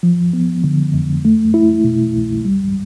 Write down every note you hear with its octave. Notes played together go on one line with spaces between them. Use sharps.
F3
B3
D3
F2
A3
E4
B2
C2
G3